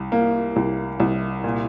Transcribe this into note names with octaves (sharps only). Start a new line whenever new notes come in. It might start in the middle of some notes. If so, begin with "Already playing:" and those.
Already playing: C2
A#3
C2
C2
A#2